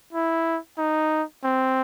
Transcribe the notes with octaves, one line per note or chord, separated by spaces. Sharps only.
E4
D#4
C4